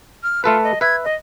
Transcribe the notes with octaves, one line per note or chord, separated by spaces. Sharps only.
F6
A3 F4 A4 B4
D#5
B4 E5 G#6
D#5